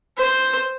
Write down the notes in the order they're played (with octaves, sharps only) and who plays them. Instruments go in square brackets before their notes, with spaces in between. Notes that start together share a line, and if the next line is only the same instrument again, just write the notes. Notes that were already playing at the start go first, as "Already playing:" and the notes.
[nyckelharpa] C5